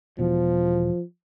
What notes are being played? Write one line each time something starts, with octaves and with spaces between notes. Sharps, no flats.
E1 E2 B2 F3